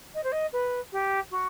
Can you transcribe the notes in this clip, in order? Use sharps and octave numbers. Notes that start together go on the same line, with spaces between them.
D#5
C5
D#5
B4
G4
F#4